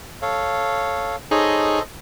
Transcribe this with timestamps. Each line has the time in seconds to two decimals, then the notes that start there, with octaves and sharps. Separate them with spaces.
0.22 A4 C#5 F5
1.31 D#4 G#4 A4 C5 C#5 D#5